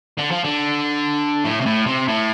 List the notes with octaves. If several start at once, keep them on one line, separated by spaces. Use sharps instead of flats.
D3
F3
D3
A2
C3
A2
C3
A2